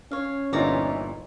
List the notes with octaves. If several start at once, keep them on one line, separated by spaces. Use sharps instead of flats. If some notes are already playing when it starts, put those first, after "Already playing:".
C#4 C#5 F5
G1 A#2 E3 D#4 F4 C#5 D5 A#5